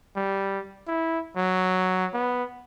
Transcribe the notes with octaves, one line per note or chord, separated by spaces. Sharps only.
G3
E4
F#3
B3